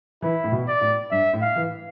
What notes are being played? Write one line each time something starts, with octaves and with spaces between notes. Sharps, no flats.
E3 E4
A2
B2
D5
A2
G2 E5
A2
F5
E3